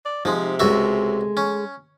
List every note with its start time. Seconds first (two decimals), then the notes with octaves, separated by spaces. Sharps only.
0.05 D5
0.25 C3 F3 G#3 D#4
0.59 C#2 G#3 A3 F#4 E5
1.37 C#4